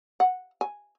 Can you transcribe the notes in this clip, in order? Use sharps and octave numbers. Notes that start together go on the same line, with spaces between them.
F#5
G#5